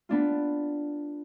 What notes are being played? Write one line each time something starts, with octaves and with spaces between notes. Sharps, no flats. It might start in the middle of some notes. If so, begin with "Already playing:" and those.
B3 D4 F4